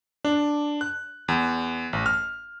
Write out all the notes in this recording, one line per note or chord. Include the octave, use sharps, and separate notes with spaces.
D4
F#6
E2
A1
F6